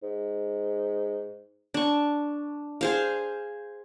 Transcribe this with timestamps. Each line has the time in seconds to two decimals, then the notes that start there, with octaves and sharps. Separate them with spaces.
0.03 G#2
1.74 D4 C#6
2.81 G#4 C5 F5